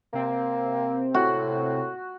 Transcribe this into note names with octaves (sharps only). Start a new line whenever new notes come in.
C3 A#3 C4
A2 F#4